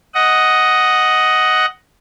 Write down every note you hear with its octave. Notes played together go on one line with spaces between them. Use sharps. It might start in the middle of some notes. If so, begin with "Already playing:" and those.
D#5 F#5